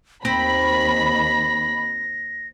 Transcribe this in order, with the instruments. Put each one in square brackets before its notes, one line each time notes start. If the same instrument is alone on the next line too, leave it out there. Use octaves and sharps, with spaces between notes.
[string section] D#2 B5 [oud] C4 [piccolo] A#6